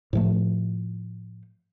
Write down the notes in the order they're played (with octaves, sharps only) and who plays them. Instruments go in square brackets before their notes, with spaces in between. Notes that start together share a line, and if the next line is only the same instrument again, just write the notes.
[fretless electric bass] A2 F3 A3